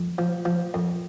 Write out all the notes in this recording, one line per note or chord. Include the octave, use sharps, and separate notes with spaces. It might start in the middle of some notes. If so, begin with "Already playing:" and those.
Already playing: F2
F3
F3
F2